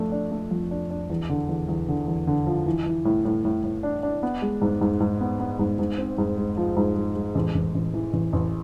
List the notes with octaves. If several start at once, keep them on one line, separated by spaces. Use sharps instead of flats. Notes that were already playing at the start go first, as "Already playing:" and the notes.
Already playing: F2 A3 D4
D4
A3
F2
D4
D4
E2
D3
E2
E2
D3
E2
D3
F3
E3
E3
A2
A2
A2
A2
D4
D4
B3
G#3
G#2
G#2
G#2
B3
B3
G#2
G#2
C4
G#2
G#3
F3
G#2
G#3
G#3
A1
A1
A1
E3
A1
A1